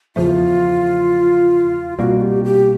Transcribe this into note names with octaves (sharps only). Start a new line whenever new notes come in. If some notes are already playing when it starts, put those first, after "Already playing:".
E2 C#3 F3 A3 F4
C2 B2 G3 A#3 F#4
G4
G4